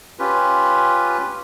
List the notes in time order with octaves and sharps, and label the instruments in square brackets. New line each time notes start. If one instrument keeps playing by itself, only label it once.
[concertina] C#4 F4 G4 B4